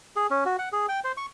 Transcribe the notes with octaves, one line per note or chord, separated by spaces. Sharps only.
G#4
C#4
F#4
F#5
G#4
G5
C5
C#6